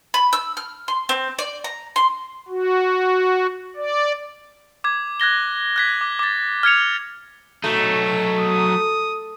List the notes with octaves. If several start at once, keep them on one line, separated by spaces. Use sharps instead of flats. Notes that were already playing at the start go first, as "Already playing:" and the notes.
B5
E6
F6
C6
C4
D5
A#5
C6
F#4
D5
D6 G#6
F#6 G#6 A#6 G7
F#6 G#6 B6
D6
D6 A6
F6 G#6 C#7 F7
F#3 A3 D#4
D#6